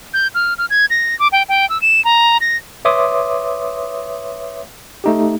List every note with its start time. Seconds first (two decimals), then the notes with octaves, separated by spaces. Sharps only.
0.14 G6
0.35 F6
0.58 F6
0.70 G#6
0.90 A#6
1.19 D6
1.32 G5
1.49 G5
1.70 E6
1.82 E7
2.05 A#5
2.41 A#6
2.85 B4 C#5 E5 C6 D6 D#6
5.04 A3 D#4 G4